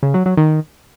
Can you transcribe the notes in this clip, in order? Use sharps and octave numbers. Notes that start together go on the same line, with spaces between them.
C#3
F#3
F#3
D#3